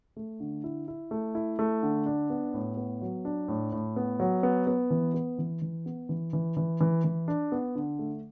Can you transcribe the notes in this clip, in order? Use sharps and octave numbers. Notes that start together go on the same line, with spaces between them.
A3
D3
E4
E4
A3
E4
A3
D3
D4
B3
A2
B3
F#3
D4
A2
A2
B3
F#3
B3
B3
E3
B3
E3
E3
B3
E3
E3
E3
E3
E3
D4
B3
D3
A3